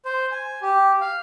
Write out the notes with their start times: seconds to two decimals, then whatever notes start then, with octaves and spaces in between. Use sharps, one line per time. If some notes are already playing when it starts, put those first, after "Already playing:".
0.05 C5
0.32 G#5
0.62 G4
1.01 F5